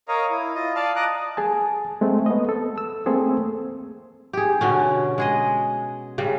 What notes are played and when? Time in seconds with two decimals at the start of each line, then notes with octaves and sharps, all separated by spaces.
0.08 A#4 C#5 D#5 F5 A#5
0.30 E4
0.55 F4 D#5
0.75 D5 F5 A5
0.96 D#5 A#5 D6 F#6
1.37 G#4 G#5 A5
2.01 G#3 A3 C4
2.26 B3 D#5
2.49 A4
2.78 E6
3.06 A3 A#3 C4 G#4 A4
4.33 G4 G#4
4.61 B2 D3 C#4
5.18 G#3 G#4 D#5
6.18 C#3 G3